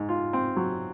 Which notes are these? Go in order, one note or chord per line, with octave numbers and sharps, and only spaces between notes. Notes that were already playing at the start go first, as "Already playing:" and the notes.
Already playing: G#2
F4
C4
F#3